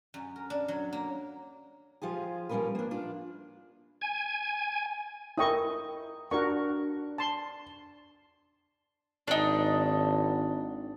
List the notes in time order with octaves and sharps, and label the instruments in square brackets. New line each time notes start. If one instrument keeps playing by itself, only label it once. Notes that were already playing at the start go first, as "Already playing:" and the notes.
[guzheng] F#2
A#4
D4
F#3
A#3
[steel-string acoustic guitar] F3 F4 G4 G#4
F3 G3 C#4 D#4 A#4 B4
A#3 D4
D4 F4 D5
[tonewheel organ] G#5
[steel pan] E4 D#5 C#6 [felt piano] A#4 G5 D#6
[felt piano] D4 [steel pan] F#4 A#4 C#6
[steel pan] A5 C6
[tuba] G#1 [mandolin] D4 D#4